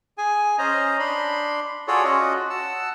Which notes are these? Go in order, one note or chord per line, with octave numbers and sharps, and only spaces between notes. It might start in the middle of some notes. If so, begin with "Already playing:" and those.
G#4 G#5
C#4 C5 D#5 A#5
D4 B5 C6
F4 F#4 G#4 A4 C#5 D5
C#4 F4 F#4 D#5 F#5
F#5 A5 E6